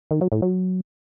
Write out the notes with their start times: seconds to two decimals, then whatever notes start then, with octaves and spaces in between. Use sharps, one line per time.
0.11 D#3
0.21 F#3
0.32 A2
0.42 F#3